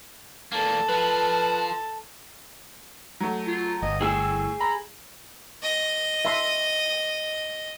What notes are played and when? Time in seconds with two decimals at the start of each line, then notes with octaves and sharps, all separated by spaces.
0.52 E2 A#3 A4
0.89 F3 B4
3.20 F#3 A3
3.47 F4
3.82 G1 D#5
4.01 A2 C4 G#4 G#5 E6 E7
4.60 A#5 B5
5.62 D#5
6.25 E5 C6